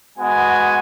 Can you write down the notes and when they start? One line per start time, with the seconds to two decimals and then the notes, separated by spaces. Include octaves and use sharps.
0.18 G#3 B3 F#4 G#5